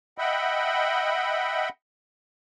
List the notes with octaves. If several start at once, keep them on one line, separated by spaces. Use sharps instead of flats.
D#5 E5 F#5 G5 B5